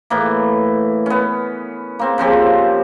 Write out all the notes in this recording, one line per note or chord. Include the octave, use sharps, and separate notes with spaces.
A2 E3 A#3
B3 C#4
A#3 C4
C#3 F3 C4 G4